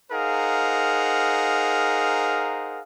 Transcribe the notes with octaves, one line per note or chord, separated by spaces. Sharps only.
D#4 G#4 A#4 C5 F5 F#5